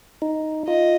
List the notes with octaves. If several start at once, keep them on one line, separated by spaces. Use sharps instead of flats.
D#4
F4 D#5